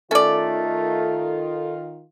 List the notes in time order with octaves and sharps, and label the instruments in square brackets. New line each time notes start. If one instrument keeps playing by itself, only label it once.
[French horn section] D#3 F4 [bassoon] A3 [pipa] C#4 D5 [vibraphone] A4